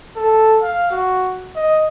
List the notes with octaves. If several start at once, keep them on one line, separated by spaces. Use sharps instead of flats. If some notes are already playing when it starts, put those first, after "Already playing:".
A4
F5
F#4
D#5